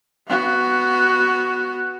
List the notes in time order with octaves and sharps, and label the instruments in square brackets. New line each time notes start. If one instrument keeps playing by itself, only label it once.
[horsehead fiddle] B3 F#4